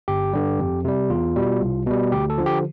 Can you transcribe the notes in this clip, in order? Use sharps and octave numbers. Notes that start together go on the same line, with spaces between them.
G1 G4
G2 D3 G3
F2
C3 G3
E2 F4
B2 G3
C2
B2 G3
D2 G4
A4
D3 F3
G4